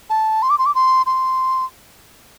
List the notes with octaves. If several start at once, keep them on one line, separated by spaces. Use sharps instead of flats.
A5
C6
D6
C6
D6
C6
C6